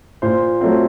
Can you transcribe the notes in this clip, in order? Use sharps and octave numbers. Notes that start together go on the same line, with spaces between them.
A#2 C5
F#3 A3 C4